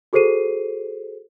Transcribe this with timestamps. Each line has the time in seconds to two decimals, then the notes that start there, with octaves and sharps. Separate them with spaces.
0.13 F#4 G#4 A4 C5 C7 D#7